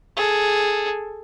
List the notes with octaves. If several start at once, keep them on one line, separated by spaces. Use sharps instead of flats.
G#4 A4